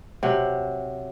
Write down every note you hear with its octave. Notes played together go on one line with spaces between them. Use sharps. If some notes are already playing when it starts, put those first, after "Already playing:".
C3 F#3